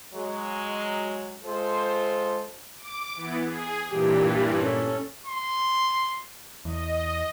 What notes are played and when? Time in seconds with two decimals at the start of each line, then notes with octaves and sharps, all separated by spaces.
0.14 F#3 G#3
1.44 G#3 F4 A4 C5
2.77 D6
3.15 E3 B3
3.45 G#4
3.91 G2 A#2 E3 G4
4.61 C#4 A4
5.26 C6
6.65 E2 D#5